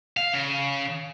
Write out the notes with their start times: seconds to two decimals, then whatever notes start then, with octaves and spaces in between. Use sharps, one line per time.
0.17 F5
0.34 C#3